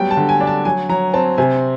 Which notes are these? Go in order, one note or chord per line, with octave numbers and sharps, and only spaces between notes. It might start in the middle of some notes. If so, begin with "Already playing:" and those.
Already playing: F#3 G3 B3 G5
A5
D3
G#5
D4
A5
F#3 G#5
F#3 A#5
C4 A5
C3 G#5